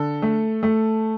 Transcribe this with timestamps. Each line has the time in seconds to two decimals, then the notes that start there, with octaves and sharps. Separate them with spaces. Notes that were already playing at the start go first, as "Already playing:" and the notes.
Already playing: D3 A4
0.22 A3
0.63 A3